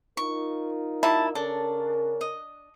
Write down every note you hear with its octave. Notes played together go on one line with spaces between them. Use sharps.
D#4 F4 A#4 C#6
G3 A#3 E4 A5
C#3 C#4 D4 A4 A#4
D#5